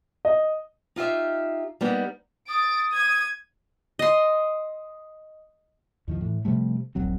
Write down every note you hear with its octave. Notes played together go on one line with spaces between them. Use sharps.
D#5
D#4 F4 G4 E5
G3 A#3 B3 D#4
D#6 A6 D7
G#6 D#7
D#5 C6
E2 D#3 F3
A2 E3
C3 F3 G3 A3
D#1 A#1 F#3 C4